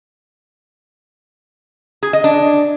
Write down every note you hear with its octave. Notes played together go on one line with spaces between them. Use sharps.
G#4
D#5
D4